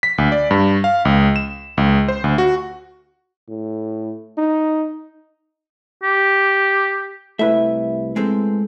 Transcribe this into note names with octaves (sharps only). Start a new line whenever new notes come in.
B6
D2
D5
G2
F5
C#2
E7
C#2
C5
D2
F#4
A2
D#4
G4
C2 A3 E4 B4 E5
G#3 C4 A4